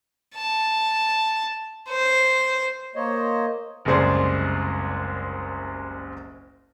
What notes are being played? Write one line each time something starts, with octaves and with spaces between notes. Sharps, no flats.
A5
C5
A#3 C5 C#5 D#5
F#1 C2 G#3 G#4 C5 D5